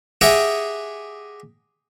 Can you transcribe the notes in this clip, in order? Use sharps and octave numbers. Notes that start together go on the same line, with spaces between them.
G4 G#4 D#5 E5 F#5 G5